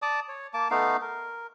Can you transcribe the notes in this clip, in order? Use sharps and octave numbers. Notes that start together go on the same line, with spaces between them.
D5 A5 D6 D#6
C#5
A#3 A5 D6
A3 B3 D#4 F5
A#4